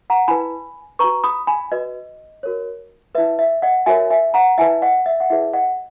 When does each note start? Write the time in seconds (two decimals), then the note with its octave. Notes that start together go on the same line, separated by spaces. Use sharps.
0.10 F#5 A#5
0.28 E4 B4 G#5 B5
0.99 F#4 B4 A#5 C#6
1.24 B5 D#6
1.47 G#5 B5
1.71 F#4 B4 D#5
2.43 F#4 A#4 C#5
3.15 E4 B4 E5
3.39 E5
3.62 D#5 F#5
3.86 F#4 A#4 C#5 E5 G#5
4.10 E5 G#5
4.34 F#5 A#5
4.58 E4 B4 E5 G#5
4.82 D#5 F#5
5.06 E5
5.20 F#5
5.30 E4 G#4 B4 E5
5.53 D#5 F#5